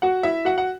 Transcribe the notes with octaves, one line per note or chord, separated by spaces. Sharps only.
F#4 F#5
E4 E5
F#4 F#5
F#5